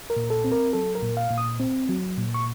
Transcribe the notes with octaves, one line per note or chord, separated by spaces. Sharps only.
A#4
A#2
A4
C4
A#4
F#3 A4
A#4
A#2
F5
A#2
D#6
C4
F#3
A#2
C#6